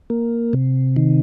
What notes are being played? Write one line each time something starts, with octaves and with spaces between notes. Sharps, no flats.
A#3
C3
D#3